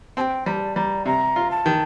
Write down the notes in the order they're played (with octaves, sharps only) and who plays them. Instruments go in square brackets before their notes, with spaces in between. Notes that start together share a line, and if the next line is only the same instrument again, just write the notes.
[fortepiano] C4 [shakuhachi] A5
[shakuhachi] G5
[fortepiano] G3 [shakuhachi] A#5
[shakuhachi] A5
[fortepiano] G3 [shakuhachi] A#5
[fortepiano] C3 [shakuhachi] A#5
[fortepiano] F4
[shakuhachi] A5
[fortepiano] D#3